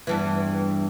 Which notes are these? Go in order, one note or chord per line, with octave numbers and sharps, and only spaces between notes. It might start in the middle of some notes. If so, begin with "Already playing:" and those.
E2 G2 E3